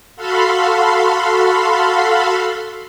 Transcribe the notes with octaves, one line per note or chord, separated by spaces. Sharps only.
F#4 A4 F5 B5 C6